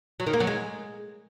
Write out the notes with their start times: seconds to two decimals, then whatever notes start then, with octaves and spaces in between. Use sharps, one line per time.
0.20 F#3
0.27 D#3
0.33 A#3
0.40 F#3
0.47 G#3